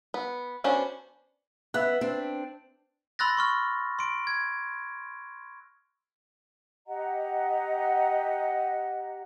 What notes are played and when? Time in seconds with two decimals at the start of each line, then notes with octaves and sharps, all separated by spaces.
0.14 B3
0.64 B3 C#4 D4 F#4 C5
1.74 B3 E5 F#6
2.01 C4 D4
3.19 B5 C6 E6 F#6 A6 A#6
3.37 C6 C#6 F6
3.99 C6 D7
4.27 G#6
6.87 G4 D#5 F#5 A#5